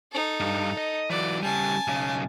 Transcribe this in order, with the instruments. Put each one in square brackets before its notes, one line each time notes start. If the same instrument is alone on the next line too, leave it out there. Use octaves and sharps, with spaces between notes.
[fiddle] D#4 A4
[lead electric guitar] G2
D#5
[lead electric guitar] E3 F#3 [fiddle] D5
[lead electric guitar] C#3 G3 [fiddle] G#5 A5
[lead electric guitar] B1 C#3